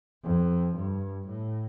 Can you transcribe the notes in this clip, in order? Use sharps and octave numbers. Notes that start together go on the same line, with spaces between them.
F2
G2
A2